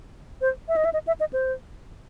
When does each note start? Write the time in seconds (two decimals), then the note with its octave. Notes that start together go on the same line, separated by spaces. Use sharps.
0.41 C5
0.68 E5
0.76 D#5
0.85 E5
0.94 D#5
1.07 E5
1.20 D#5
1.33 C5